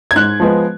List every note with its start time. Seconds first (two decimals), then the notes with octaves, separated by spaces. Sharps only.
0.11 G#6
0.16 G#2 F#6
0.40 F3 G#3 B3